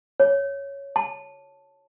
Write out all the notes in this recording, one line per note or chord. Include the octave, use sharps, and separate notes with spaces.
C#5
A5